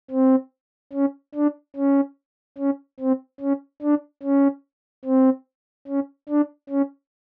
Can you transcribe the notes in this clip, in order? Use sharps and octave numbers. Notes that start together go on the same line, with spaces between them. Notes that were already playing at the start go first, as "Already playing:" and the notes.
C4
C#4
D4
C#4
C#4
C4
C#4
D4
C#4
C4
C#4
D4
C#4